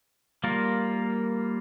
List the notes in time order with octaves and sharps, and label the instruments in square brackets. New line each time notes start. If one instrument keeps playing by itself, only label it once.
[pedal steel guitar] G3 A#3 F4 A#4